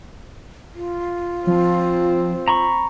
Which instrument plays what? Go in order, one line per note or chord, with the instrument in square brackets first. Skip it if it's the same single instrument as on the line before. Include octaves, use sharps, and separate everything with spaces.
[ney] F4
[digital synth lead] F3 [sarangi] C4
[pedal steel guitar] A#5 B5 C#6